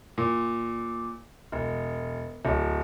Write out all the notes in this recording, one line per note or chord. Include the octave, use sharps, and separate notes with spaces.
A#2
E1
D1